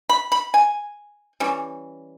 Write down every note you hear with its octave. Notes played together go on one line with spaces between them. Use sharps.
B5
B5
G#5
E3 G3 C#4